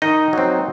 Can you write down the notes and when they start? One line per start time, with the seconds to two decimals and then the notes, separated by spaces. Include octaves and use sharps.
0.02 D#3 D#4 D#5
0.33 F#3 C4